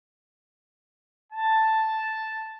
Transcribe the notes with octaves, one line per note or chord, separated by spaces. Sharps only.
A5